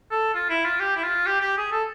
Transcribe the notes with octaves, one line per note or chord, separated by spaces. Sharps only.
A4
F4
E4
F4
G4
E4
F4
G4
G4
G#4
A4